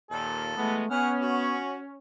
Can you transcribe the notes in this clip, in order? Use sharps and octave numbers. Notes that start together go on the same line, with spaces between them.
D#2 A#2 A4
E3 G#3 A3 B3
B3 C#4 G#4 F#5 F6
F#4